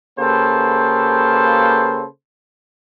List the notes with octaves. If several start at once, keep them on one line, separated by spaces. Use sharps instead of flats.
C#3 A#3 G4 A4 B4 C5